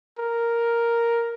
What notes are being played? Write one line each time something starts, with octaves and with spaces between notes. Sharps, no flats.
A#4